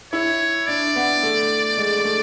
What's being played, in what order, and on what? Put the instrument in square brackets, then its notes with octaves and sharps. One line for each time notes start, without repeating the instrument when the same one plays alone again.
[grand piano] E4 [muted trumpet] C#5
[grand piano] D4 [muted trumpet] D5
[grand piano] B3
A3
G#3
A3